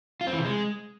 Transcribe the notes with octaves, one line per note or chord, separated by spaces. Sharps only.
F4
C4
E3
C3
G#3